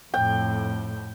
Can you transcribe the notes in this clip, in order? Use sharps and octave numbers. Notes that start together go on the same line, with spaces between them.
F2 A2 G5